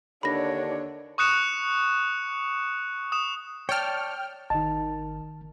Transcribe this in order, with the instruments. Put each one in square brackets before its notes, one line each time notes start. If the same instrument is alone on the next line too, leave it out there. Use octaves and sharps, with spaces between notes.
[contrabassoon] D#2 [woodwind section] D3 [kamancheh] D4 C#5 [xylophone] B5 A#6
[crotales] C#6 D#6 F#6 C#7 E7
D#6 E7
[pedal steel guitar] C#5 D5 A5 [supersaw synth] G5 F6
[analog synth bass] G#1 [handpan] D#3 D#5 [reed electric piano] A5